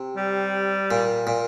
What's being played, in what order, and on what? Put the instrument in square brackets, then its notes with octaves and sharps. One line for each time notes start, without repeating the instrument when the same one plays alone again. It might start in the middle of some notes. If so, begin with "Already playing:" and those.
Already playing: [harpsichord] C3
[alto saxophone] G3
[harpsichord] A#2
A#2